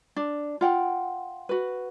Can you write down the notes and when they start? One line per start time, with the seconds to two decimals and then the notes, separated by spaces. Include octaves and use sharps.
0.16 D4
0.61 F4 F#5 G5
1.49 F#4 B4